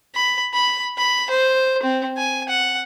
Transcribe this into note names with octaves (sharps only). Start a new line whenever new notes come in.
B5
B5
B5
C5
C4
G#5
F#5